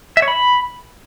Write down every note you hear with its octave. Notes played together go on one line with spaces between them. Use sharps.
E5
C#5
B5